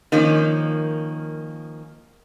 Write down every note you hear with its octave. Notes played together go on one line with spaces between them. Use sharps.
D#3 F3 A#3 C#4